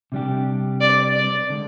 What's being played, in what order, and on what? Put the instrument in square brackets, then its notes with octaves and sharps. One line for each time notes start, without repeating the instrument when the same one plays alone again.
[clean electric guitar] C3 G3 D4 G4
[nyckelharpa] D5
D5
[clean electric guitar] D3 G#3